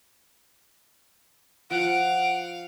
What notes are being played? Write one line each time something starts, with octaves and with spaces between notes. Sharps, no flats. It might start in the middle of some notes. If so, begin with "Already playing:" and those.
F3 F5 F#5 D7